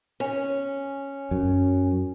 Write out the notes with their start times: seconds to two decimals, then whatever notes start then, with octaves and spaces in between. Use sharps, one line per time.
0.20 C#4
1.31 F#2